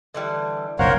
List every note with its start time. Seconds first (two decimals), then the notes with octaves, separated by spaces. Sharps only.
0.14 D3 E3 G3
0.79 F#1 B1 A#4 C5 C#5 F5 F#5